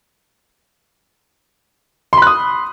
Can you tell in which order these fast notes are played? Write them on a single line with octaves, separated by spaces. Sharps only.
C6 B5 F#6 D#6